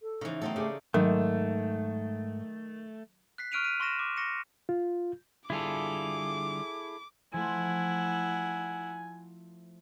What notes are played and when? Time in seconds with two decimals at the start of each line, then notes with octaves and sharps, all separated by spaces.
0.02 A4
0.21 C#3 E3 D#4 C5
0.41 B2 F#3 A3 C4 D#4 A4
0.56 C#3 G4 G#4 D5
0.94 G#2 D#3 F#3 A3
3.38 F#6 B6 C7
3.52 C#6 F6 F#6 D7 D#7 F7
3.64 B6 D#7
3.80 C6 C#6 F6 A#6 E7
3.99 D6
4.16 C#6 A#6 C#7 E7
4.69 F4
5.50 D3 G3 E4 F4 G#4 A4 D6
7.33 F3 A3 E4 F#5 G#5